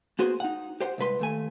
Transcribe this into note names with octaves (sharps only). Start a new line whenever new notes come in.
A#3 B3 F#4 G#4 C5
D#4 F#5
G4 C5 F#5
C2 G#2 B4 C6
D#2 A3 G#5